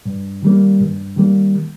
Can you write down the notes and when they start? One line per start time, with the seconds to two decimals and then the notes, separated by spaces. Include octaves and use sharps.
0.06 G2
0.42 D#3 G3 A#3
0.80 G2
1.17 D#3 G3 A#3